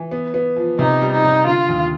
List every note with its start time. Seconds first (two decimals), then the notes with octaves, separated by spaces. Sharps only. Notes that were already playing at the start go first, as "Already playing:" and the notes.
Already playing: E3
0.11 B3
0.34 B3
0.56 F3
0.79 C3 D#4
1.02 G3
1.12 D#4
1.24 C3
1.47 D3 F4
1.69 D#2